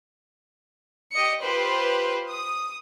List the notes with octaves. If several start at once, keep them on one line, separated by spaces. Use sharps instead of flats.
G4 D#5 C#7
F4 G4 B4 C5
D#6